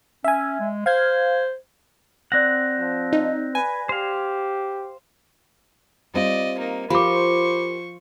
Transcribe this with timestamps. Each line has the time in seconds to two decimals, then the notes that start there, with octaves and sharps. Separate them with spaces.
0.24 C#4 E5 G#5
0.60 G#3
0.86 C5 F5 G#6
2.32 C4 D5 F#5 F#6 A#6
2.79 F3
3.13 D#4
3.55 B4 G#5
3.89 G4 C5 F5
6.14 G3 C4 F4 D5 D#5
6.58 A#3 D#4
6.90 F3 G4 A#4 C5 B5 C#6 D6